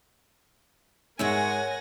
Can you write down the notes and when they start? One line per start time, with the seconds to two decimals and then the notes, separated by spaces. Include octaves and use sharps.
1.19 G#2 G#3 A#4 C#5 E5 F#5 G#5 A#6